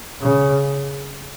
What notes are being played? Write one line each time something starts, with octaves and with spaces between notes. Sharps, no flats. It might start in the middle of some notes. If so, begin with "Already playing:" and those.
C#3